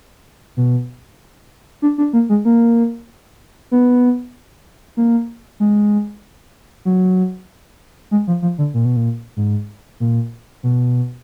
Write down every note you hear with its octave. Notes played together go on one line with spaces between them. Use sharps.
B2
D4
D4
A#3
G#3
A#3
B3
A#3
G#3
F#3
G#3
F3
F3
D3
A#2
B2
A#2
G#2
A#2
B2